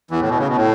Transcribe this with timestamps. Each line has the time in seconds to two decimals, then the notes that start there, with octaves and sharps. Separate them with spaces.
0.11 E2 E3
0.20 A2
0.29 B2
0.38 C#3
0.47 B2
0.56 A2